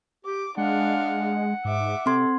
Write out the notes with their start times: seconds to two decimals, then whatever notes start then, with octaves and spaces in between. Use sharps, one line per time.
0.25 G4 D6
0.57 G#3 D4 F5 F#5
1.65 G#2 E5 D6
2.06 C3 C4 A4 C6 G#6